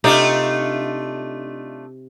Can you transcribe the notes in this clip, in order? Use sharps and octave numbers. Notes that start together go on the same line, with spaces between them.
C3 A3 D4 D#4 F4 G5